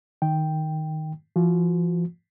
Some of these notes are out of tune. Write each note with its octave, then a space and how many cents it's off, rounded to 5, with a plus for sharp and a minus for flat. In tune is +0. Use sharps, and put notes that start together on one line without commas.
D#3 +0 G5 +0
F3 -40 F#4 -30